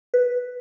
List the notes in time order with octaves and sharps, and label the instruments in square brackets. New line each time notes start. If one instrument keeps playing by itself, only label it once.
[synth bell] B4